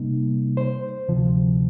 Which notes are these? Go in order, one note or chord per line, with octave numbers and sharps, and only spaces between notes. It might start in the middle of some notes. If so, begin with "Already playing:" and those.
Already playing: C3 G3 A#3 D#4
C5
D2 C3 F3